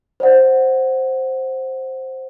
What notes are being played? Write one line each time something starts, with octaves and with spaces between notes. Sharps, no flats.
C5 D5 F#5